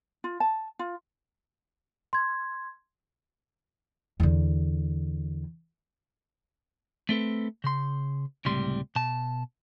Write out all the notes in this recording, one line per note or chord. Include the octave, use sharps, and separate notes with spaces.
F4
A5
F4
C6 G#6
E2 D3
A3 C4 A4 B4
C#3 C6
C#2 A2 C3 G3 C6
B2 A5